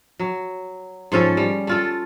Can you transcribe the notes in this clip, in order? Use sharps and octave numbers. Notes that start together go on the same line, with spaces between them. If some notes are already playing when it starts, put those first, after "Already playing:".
F#3
G#2 F3 C#4 A4
G3
A3 F4 A4